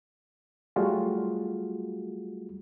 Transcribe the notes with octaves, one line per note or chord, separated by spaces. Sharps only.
F#3 G3 A3 F4 F#4 G#4